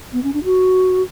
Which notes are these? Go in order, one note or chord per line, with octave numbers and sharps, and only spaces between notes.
B3
C#4
D4
F#4